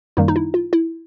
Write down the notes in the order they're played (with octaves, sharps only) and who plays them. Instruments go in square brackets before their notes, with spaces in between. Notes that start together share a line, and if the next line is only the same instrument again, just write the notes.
[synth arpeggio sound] F#2 D#3 G3 A#3 D#4
D#4
E4
F4
E4